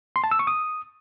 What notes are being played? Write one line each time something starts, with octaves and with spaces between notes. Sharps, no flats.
C6
A5
E6
C#6
D#6